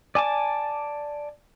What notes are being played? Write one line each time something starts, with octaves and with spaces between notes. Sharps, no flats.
D5 G#5 A5 D6